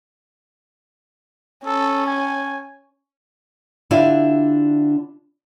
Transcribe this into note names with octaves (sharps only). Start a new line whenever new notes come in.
C#4 A4
G#5
D3 D4 E4 F4 G4